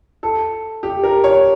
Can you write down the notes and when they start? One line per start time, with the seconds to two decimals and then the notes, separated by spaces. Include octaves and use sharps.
0.23 A4
0.83 G4
1.03 A#4
1.24 C#5